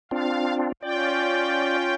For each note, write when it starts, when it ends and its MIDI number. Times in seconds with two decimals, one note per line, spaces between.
0.11 0.72 60
0.11 0.72 62
0.11 0.72 65
0.11 0.55 77
0.83 1.94 61
0.83 1.94 65
0.83 1.77 74
0.83 1.94 79